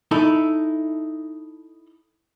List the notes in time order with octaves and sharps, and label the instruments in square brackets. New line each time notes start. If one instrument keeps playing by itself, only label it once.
[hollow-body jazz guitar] D#4 E4 A4